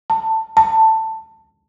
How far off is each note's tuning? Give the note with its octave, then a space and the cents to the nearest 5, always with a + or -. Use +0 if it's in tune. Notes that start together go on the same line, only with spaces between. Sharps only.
A5 +20
A5 +15